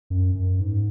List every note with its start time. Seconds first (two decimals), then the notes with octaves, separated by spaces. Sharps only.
0.10 F#2
0.35 F#2
0.60 G#2